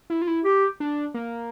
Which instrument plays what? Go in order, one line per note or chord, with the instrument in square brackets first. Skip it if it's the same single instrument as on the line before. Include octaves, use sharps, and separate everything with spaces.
[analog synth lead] E4
F4
E4
[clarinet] G4
[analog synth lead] D4
A#3